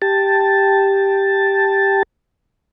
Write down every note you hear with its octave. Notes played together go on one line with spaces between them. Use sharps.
G4 A5